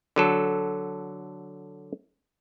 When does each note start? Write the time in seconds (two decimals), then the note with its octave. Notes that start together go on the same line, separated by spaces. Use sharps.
0.16 D3 F#3 A4